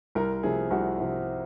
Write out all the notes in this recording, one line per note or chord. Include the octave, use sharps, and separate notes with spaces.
C2 A#4
C3 F3 G#4
C2 F#4
C3 F3